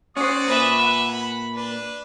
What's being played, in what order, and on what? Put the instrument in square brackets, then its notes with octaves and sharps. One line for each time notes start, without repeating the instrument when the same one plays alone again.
[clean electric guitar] C#4 C5 [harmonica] F#4 D5 D#6
[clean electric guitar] A#2 [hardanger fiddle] B4 E5
[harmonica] F#5
[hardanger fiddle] B5
[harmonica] D4 [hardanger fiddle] B4